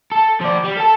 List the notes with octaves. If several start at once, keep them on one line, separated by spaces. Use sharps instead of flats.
A4
F3 D5
G3
A4 A5